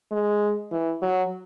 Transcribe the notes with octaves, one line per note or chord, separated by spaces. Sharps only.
G#3
E3
F#3